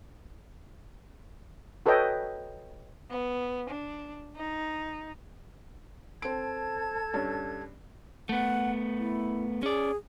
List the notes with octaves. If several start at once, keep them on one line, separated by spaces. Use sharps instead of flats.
F#4 A4 B4 C#5 D#5 G5
B3
D4
D#4
C4 A4 A5 G#6 D7
G2 C#4
A3 B3 F#5
E4
C#4 G#4 D5